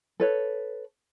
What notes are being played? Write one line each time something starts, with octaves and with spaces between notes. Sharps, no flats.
A4 B4 C#5